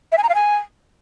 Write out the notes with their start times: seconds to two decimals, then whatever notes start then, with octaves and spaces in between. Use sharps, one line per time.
0.12 E5
0.18 G#5
0.23 A#5
0.29 F5
0.35 G#5